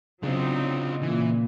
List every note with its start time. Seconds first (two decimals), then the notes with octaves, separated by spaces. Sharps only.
0.23 C#3 F#3 C4 D4 D#4 F4
1.02 A#2 E3